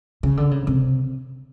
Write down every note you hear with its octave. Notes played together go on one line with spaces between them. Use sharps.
C#3
D3
C#3
C3